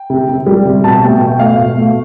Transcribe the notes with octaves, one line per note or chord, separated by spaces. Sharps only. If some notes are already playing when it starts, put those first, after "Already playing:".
Already playing: G5
C3
C3
G3
C3
B2 A5
A3 G5
B2 G5
A3 F5
B2
A3